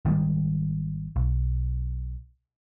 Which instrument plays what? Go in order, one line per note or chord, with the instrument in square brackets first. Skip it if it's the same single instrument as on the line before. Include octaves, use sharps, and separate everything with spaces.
[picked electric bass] G#1 D#3 G3 G#3
B1